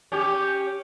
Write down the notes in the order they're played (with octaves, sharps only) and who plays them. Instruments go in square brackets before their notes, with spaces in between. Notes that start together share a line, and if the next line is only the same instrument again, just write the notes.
[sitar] C#4 G4